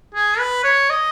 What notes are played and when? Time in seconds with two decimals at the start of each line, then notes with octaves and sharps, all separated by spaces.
0.15 G#4
0.39 B4
0.64 C#5
0.90 D#5